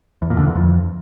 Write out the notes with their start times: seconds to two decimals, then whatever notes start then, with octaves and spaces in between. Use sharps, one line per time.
0.22 E2
0.30 A#2
0.39 D3
0.47 E2
0.55 F2